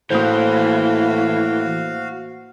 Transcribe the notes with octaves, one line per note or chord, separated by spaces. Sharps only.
A2 E3 A#3 F#4 C5 F5